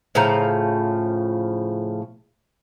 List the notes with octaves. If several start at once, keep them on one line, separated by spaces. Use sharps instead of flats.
A2 C#3 F3 A#5